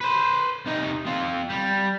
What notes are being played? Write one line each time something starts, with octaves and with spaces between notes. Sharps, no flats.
B4 C5
C3 D#4
C4 F4
G3